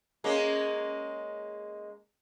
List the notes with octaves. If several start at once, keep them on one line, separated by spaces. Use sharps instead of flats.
G#3 A#3 C#4